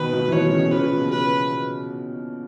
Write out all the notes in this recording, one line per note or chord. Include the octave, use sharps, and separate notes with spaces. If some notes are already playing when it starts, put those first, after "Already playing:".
Already playing: B2 D#3 B4
B2 D#3
E3
B2 D#3 C#5
C#3 E3
B2 D#3
A#2 C#3 B4
A#2
B2
A#2 C#3 B4